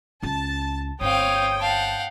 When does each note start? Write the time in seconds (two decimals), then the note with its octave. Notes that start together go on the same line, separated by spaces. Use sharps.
0.23 C#2 C#4 A5
1.01 G1 C4 C#5 F5 G5 D#6
1.61 F5 F#5 A5